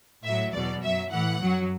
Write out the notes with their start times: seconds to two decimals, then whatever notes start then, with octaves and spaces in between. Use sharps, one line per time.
0.24 A2 F#3 E5
0.52 E2 B2 F#3 D5
0.81 F#2 F#3 E5
1.11 A2 E3 F#5
1.40 F#2 F#3